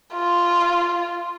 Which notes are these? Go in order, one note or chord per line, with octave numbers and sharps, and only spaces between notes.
F4